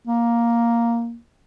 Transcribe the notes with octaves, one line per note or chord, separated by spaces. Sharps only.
A#3